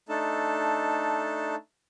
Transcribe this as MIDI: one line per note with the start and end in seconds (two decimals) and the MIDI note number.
0.09 1.55 57
0.09 1.55 62
0.09 1.55 63
0.09 1.55 69
0.09 1.55 81